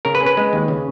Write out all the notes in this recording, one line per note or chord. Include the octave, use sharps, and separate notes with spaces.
C#3 A#4
B4
C#4
B4
G#3
D#2
C#3